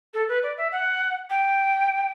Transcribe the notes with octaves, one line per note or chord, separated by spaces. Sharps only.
A4
B4
D5
E5
F#5
G5